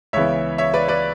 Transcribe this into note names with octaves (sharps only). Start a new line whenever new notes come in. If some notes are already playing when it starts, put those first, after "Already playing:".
C#2 C#3 E3 B3 C#5 E5
C#5 E5
B4 D5
B4 D5